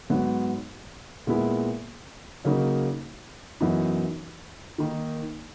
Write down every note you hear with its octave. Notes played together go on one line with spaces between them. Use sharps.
G#2 F#3 B3
A#2 G#3 B3 E4
C#3 F#3 A#3 D#4
F#2 E3 B3 D#4
D#3 A#3 D#4